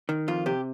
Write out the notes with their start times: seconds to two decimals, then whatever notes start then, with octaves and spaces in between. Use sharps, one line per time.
0.09 D#3
0.28 F2 F4
0.46 C3 G4